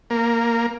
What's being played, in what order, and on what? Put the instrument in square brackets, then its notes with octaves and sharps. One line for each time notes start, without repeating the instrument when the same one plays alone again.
[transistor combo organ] A#3